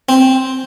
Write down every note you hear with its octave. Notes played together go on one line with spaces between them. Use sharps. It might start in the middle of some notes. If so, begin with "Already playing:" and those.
C4